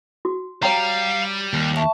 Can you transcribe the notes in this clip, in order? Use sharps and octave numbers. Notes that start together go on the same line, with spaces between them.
F#4
G3 C#5 F5 G5 A#5
D#2
E5 A5 C#6